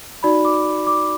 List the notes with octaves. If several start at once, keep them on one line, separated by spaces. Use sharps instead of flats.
D#4 F#4 D5 B5
D6
D6